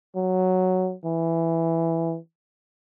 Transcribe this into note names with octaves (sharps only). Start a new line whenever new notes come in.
F#3
E3